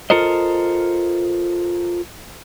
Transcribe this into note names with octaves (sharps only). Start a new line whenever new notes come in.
F4 A4 A#4 C5 D#5